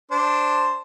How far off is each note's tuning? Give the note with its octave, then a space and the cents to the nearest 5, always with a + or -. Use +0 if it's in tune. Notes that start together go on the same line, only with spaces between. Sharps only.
D4 +0 C5 +0